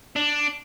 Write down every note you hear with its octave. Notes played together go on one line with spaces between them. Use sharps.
D4